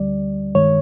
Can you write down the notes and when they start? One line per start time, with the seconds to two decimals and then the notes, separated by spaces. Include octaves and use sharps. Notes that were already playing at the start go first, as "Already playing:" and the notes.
Already playing: D2 D3 G3 D5
0.55 G2 D#3 G#3 C#5